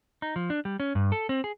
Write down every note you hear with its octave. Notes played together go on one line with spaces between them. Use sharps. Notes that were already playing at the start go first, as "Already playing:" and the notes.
D#4
F3
D4
G3
C#4
G2
A4
C4
G#4